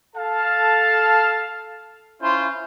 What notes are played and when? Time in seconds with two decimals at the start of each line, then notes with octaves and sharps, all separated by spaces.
0.16 A4 F5 A5
2.21 C#4 E4 F4 C5